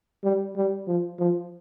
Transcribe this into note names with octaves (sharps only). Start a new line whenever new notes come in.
G3
G3
F3
F3